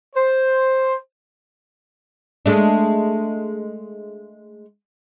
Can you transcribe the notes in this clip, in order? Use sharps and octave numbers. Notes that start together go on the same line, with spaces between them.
C5
G#3 A3 D4